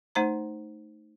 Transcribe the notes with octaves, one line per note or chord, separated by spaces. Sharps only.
A3 D#4 C5 A#5